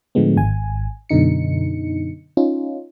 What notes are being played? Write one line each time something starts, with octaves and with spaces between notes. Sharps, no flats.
A2 D3 F3 G#3 B3
G#1 G#5
F#2 B2 D3 D#4 C#7
C#4 D#4 F4